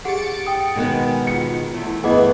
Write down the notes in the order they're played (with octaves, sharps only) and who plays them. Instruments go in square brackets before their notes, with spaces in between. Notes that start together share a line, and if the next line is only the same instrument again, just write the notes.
[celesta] G4 G#4 F#5 [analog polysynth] A6 C#7 D7
[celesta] G5 D#6
[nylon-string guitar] B2 D#3 [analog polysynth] G#3 B3
[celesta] F4 F#5 [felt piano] C#7
[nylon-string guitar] E2 [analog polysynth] A3
[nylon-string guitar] E2 G2 E3 [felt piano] B3 [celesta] G#4 D#5 F#5